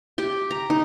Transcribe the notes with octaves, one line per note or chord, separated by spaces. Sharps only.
G4 G5
A#5
D#4